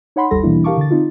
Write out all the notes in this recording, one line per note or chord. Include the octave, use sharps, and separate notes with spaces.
D#4 C#5 F#5 B5 C6
G#1 D#2 G3 A4 A#6
B2 E3 G3 A#3 D4 E4
G4 A#4 F5 A5 C#6 D6
D3 A6
C4 D#4 F4